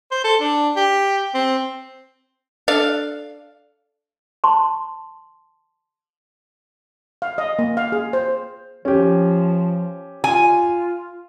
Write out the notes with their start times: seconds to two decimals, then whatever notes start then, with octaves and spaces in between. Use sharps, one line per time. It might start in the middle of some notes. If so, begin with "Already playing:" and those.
0.12 C5
0.24 A4
0.41 D4
0.77 G4
1.34 C4
2.68 D4 A4 E5 F5
4.44 A5 C6
7.22 F5
7.38 D#5
7.59 A#3
7.77 F5
7.92 G#4
8.13 C5
8.85 F3 C#4 G4
10.24 F4 G#5